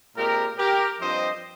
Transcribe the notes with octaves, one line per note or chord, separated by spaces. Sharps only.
A#2 G#3 C4 G4 A#4
G4 A#4
G2 F3 C4 C5 D#5